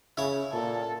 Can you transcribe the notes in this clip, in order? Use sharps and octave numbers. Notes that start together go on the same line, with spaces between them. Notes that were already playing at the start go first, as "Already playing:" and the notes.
C#3 E4 C#5
A#2 A4